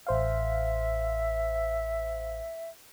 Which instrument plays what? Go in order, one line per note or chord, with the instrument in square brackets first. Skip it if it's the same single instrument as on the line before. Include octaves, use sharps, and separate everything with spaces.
[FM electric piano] A1 C5 F5 [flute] E5